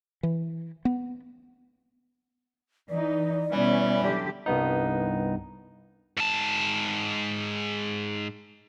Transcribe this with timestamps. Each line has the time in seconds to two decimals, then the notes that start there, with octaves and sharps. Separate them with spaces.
0.23 E3
0.85 B3
2.90 E3 D#4 D5
3.52 B2 E3 G3 B3 C#4
4.02 D3 F#3 G4
4.46 C2 G2 B3 D#4
6.17 G#2 A5